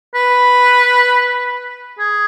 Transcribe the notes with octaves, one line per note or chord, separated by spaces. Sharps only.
B4
G#4